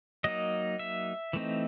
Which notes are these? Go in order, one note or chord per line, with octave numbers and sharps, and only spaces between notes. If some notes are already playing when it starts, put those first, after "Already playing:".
F#3 A#3 D#4 D#5
E5
E3 A3 C4 D#4